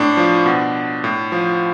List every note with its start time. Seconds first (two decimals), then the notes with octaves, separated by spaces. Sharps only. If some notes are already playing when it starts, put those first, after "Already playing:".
Already playing: A2 D4
0.17 F3
0.46 B2
1.04 A2
1.32 F3